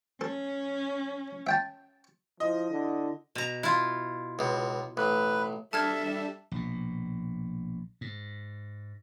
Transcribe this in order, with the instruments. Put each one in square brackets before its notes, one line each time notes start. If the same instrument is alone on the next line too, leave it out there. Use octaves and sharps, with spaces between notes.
[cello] C#4 [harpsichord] A4
[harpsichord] E5 G5 A5
[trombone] F3 [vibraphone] E4 [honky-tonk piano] D#5
[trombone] D3
[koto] B2 A#5
E4 F4
[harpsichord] C#2 B2
[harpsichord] A1 [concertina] B4
[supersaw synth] G3 D4 [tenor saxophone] A4 [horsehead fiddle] E5 [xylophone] A5 F6 G#6
[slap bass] A#1 B2
G#2